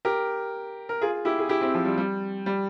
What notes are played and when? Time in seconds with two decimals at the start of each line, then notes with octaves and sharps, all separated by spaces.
0.05 G4 A#4
0.89 A#4
1.02 F4 G#4
1.25 E4 G4
1.39 G#4
1.49 E4 G4
1.61 C4 E4
1.74 F3
1.85 G3
1.98 G3
2.46 G3